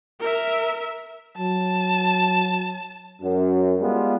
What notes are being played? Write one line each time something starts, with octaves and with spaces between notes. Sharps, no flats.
A#4 E5
F#3 A5
F#2
G3 G#3 B3 F4